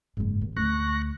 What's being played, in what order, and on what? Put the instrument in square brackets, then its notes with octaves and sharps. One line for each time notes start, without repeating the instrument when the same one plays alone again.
[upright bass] F#1 G#3 [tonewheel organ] G#2
[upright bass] D#2
[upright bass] D2 [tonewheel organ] C#6 F#6 A#6